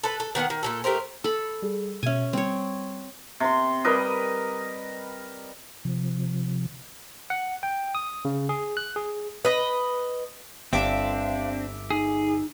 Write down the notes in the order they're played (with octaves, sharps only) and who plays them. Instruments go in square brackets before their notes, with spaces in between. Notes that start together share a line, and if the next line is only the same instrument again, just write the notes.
[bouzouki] A4 B4
A4
D#3 B3 D4 F#5
D#3
A#2 D#3 A4
A3 G4 A#4 C5
[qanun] A4 B5
[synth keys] G3 G#4
[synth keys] B2 E5 [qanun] C#4 G#5
[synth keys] G3 [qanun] C4 C#5
[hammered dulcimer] C3 C6
G3 A#4 B4 D#5
[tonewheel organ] C3 F3
[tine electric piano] F#5
G5
D#6
C#3
G#4
F#6
G#4
[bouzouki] B4 D#5
[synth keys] G1 E5 D6 [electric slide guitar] C4 D4 [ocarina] F5
[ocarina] D#4 [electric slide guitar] G#4